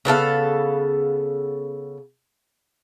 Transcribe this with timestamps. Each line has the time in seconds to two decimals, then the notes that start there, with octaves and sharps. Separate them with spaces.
0.05 C#3 B3 A4 F5